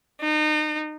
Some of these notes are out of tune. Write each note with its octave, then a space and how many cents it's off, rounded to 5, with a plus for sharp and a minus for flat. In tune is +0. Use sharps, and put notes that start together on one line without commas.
D#4 -30